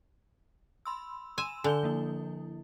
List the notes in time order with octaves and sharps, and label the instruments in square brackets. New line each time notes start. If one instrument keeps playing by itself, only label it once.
[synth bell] B5 C6 E6
[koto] G#5 [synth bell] C6 E6 E7
[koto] D3 [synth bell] G#5 G6 G7
[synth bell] F3 A#3 E4